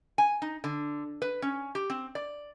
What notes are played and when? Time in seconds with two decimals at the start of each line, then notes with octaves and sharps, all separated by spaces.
0.18 G#5
0.42 D#4
0.64 D3
1.22 B4
1.42 C#4
1.75 G4
1.90 C4
2.15 D5